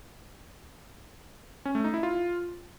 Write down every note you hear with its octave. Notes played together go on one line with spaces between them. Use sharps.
C#4
A3
D#4
E4
F4